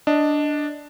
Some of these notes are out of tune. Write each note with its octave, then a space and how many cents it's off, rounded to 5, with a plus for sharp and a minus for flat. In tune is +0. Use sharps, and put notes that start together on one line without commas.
D4 +0 D#5 +0